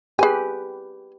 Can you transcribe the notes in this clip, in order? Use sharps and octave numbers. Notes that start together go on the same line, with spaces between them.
G4 G#4 B4 G#5